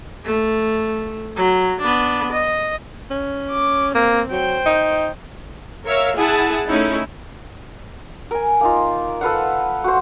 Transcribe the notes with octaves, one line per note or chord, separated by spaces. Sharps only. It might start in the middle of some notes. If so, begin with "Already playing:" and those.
A3
F#3
B3 D4
D#5
C#4
D6
A#3 C4
F#3 C5 G5
D#4
A#4 C#5 E5 F5
E4 G#4 F#5 A5
A3 C#4 D#4 E4
A#4 G#5
A#3 D#4 F4
A4 B4 F5 F#5
F#4 C5